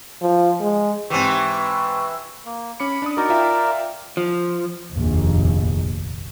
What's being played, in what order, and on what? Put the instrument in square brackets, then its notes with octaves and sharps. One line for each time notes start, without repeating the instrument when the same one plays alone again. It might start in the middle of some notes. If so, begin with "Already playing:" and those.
[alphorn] F3
G#3
[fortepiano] G#2 G4 [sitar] E3 C4 [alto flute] C#6 [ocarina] E6
[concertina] A#3
[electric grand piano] C#4 D6 C#7 [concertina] B5
[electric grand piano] D4 D5 D#6
[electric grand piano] D#4 F#4 [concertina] A#4 D5
[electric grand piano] F4 E5 G5
[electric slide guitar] F3
[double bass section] F1 A#1 D#2